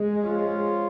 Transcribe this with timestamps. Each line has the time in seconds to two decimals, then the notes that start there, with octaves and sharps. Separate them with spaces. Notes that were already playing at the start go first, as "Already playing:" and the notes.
Already playing: G#3
0.24 F3 C#4 F4